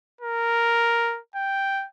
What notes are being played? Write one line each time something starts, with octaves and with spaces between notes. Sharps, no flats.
A#4
G5